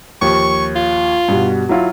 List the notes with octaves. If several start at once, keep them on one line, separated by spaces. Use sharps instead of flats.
D#2 F3 C#6
F4
G2 B2
F#3 E4 F4